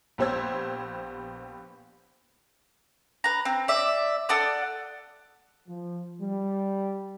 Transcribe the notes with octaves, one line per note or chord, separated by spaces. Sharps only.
A#1 B3 G4 C5 E6 G#6
B4 A#5
C4
D5 E5
A4 D5 F#5 D#6
F3
G3